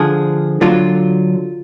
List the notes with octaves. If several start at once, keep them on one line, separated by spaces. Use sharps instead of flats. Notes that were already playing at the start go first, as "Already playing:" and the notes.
Already playing: D3 F3 G#4
D3 F#3 F4